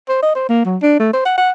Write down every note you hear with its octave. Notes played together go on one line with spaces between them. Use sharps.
C5
D#5
C5
A#3
F#3
D4
A3
C5
F#5
F#5